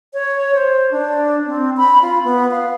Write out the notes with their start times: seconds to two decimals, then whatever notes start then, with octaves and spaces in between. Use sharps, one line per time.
0.14 C#5
0.54 C5
0.91 D4
1.47 C4
1.77 B5
2.02 F4
2.24 B3
2.51 F5